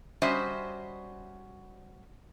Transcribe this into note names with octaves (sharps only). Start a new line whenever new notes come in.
G3 C#4 F#4 C5 D#5 E5